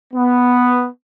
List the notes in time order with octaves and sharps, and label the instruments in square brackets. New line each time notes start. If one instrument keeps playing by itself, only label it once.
[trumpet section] B3